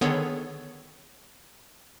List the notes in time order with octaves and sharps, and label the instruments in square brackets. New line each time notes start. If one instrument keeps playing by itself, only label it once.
[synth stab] D3 D#3 B3 G#4 A4 C#5